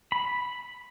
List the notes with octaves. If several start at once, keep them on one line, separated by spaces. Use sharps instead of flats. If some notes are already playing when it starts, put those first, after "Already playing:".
B5